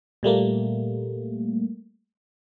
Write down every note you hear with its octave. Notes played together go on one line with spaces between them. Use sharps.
A#2 G3 A3 A#3